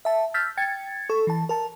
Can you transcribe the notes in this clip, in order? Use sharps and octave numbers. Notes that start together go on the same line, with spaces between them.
E5 A5
E6 F6 G6 A6 B6
G5 G#6 A6 C#7
A4 C#6
E3 A5
A#4 A5